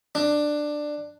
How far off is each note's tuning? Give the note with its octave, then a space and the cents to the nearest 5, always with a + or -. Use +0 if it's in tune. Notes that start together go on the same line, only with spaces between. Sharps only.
D4 +15